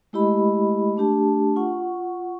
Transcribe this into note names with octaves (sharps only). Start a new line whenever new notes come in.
G#3 A3 E4 G4 D#5 B5
A3 D4 G4 A5
F4 F#5 C#6